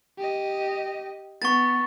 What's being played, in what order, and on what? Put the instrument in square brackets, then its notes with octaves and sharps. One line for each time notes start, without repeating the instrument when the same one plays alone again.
[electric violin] G4 D#5
[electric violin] B3 [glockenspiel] C#6 A6